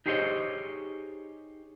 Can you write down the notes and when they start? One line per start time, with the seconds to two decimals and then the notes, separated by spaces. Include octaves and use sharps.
0.06 D#4 G4 G#4 C5 C#5 D#5